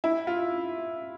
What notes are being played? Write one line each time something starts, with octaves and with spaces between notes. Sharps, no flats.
E4
F4